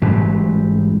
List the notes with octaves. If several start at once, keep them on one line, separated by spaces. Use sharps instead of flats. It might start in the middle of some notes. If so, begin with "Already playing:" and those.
A1 G#2 F#3 G3